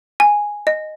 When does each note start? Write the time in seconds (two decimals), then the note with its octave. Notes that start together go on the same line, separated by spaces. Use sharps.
0.20 G#5
0.67 D#5